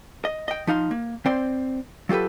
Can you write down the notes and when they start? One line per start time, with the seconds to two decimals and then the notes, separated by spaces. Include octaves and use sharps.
0.25 D#5
0.48 D#5 G5
0.67 F3 D#4 F5 C6
0.91 A#3
1.26 C4 C5 D5 C6
2.09 F#3 F4 G4 A4 B4